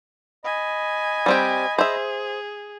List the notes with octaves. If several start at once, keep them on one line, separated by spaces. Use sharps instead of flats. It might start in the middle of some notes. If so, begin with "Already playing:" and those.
D#5 G#5 B5
G3 C4 G4
G#4 C5 E5